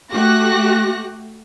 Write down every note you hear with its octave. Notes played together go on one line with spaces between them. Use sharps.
A3 F#4 G4 F#6 A#6